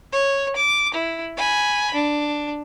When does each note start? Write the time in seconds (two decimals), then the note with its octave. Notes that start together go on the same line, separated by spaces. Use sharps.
0.13 C#5
0.56 D6
0.94 E4
1.37 G#5 B5
1.94 D4